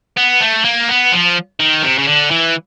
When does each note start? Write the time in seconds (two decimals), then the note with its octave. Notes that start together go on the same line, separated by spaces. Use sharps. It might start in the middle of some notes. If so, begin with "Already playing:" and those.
0.17 B3
0.41 A3
0.65 A#3
0.89 B3
1.12 F3
1.60 D#3
1.83 C3
1.98 C#3
2.07 D3
2.31 E3